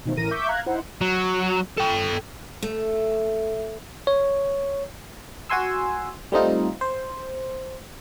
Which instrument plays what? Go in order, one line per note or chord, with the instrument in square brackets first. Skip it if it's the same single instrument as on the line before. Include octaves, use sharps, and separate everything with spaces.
[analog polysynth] B2 D#3 F3 A3
A1 E3 A#4 A#6 D#7
E5 C#6 D6 G6 B6
F5 A#5 F#6 G#6
D#4 E4 C5 F#5
[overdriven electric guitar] F#3
A4 G5
[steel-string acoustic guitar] A3
[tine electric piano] C#5
[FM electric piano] F#4 F#5 G#5 C6 E6
G3 A3 C4 D#4 F4
C5